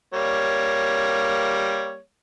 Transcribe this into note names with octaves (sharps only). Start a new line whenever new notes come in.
G3 A#3 C#5